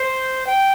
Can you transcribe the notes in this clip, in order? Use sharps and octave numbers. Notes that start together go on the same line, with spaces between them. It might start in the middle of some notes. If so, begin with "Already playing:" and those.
Already playing: C5
G5